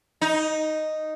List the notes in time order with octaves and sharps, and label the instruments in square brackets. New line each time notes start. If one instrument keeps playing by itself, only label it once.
[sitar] D#4